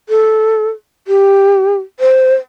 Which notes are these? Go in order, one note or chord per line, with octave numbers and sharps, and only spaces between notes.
A4
G4
C5